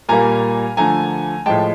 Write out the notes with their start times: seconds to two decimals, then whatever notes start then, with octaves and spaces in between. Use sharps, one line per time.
0.09 A#2 G3 A#3 G#5 A#5
0.77 D3 F3 A3 G#5 A#5
1.46 A2 F3 G#3 G5 A5